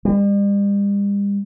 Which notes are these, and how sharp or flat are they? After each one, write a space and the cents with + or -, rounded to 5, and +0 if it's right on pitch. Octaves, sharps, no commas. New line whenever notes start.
G3 +45